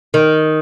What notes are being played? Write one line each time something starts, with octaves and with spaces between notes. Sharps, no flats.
D#3